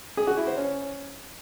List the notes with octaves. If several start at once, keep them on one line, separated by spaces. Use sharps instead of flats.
G#4
F#4
E4
C5
C#4